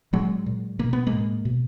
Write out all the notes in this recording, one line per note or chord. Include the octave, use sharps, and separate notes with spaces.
A#2 F#3 G#3
A#2
B2 A#3
B3
G#3 A#3
A2
B2